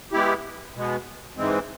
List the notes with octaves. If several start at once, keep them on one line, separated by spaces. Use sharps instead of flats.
G#3 B3 E4 G4
B2 G#3 B3
G#2 E3 G#3 C4